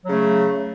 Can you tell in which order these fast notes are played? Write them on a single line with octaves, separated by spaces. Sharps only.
F#3 C#3 A3